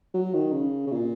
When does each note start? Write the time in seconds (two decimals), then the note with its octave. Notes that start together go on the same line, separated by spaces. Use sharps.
0.14 F#3
0.34 D#3
0.52 C#3
0.87 C#3
0.92 A#2